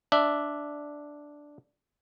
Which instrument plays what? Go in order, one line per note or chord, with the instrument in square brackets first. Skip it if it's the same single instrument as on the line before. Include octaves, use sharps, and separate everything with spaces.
[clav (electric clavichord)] D4 E5